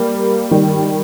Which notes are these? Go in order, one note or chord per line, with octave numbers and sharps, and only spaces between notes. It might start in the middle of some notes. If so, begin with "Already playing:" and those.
Already playing: G3 A#3
D#3 G3